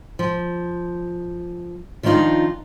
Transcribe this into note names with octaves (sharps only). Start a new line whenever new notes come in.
F3
D#3 F3 D4 D#4 F4